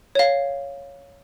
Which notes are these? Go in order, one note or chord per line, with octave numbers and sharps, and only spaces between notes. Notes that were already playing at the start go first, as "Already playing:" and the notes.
C#5 F5